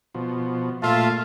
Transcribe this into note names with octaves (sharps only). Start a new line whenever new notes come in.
B2 F3
A#2 A3 F4 E5 F5 A5